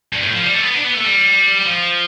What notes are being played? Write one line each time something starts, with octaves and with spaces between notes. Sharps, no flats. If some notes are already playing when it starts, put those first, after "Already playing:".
G2
A2
F3
G3
A3
B3
D4
B3
A3
G3
F3